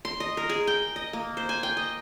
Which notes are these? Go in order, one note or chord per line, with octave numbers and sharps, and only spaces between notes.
C6
D#5
A#4
G#4
G5
D#5
A#3
C5
G#5
G5
D#5